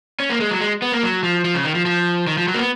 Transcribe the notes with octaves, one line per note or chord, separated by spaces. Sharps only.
C#4
A#3
G#3
F#3
G#3
B3
A#3
F#3
F3
F3
C#3
D#3
F3
F3
D#3
F3
F#3
A#3
B3